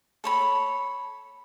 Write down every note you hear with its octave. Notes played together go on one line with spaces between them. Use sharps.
A4 C#5 B5